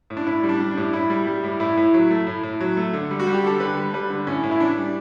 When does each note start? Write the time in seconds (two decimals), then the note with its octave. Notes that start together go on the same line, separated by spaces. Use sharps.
0.10 A2
0.17 D4
0.26 A2 E4
0.43 G3
0.49 D4
0.60 G3
0.71 D4
0.77 A2
0.93 A2 E4
1.10 G3
1.27 G3
1.44 A2
1.60 A2 E4
1.77 A2
1.94 F#3
2.11 A3
2.27 A2
2.43 A2
2.60 F#3
2.77 A3
2.93 D3
3.11 G3
3.19 F#4
3.27 G3
3.33 G4
3.44 D3 A4
3.60 D3 B4
3.77 G3
3.94 G3 B4
4.10 D3
4.27 A2 C#4
4.43 A2
4.51 E4
4.60 E3 D4
4.77 G3